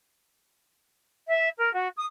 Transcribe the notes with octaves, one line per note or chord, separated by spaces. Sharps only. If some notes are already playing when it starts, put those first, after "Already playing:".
E5
A#4
F#4
D#6